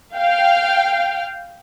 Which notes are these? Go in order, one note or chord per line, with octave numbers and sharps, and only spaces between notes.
F5 G5